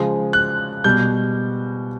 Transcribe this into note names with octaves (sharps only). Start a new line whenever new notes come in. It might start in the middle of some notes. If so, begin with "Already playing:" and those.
Already playing: C#3 F3 G#3
F#6
B2 G3 G6